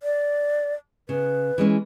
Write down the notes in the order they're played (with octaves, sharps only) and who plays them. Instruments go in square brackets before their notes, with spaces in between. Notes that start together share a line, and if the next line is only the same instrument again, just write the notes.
[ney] D5
[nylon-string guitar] C#3 [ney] B4
[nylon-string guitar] E3 G#3 C#4